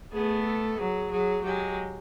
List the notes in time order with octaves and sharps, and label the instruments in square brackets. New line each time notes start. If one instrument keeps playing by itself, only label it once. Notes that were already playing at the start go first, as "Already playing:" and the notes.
[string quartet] A3 B3 [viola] G#4
[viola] A4
[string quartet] F#3 [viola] G#4
[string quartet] F#3 [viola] G#4
[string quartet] F#3 G#3 [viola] G4